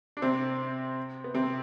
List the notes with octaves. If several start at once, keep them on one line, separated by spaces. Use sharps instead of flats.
D4
C3 C4
B3
C3 C4